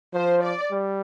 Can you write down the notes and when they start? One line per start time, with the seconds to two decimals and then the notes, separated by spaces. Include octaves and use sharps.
0.14 F3 C5
0.43 D5
0.71 G3